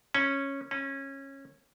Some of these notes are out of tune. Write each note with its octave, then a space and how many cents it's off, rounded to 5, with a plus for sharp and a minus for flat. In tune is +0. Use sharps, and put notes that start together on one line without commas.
C#4 -10
C#4 -20